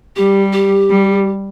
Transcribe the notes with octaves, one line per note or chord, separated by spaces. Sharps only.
G3 G4
G4
G3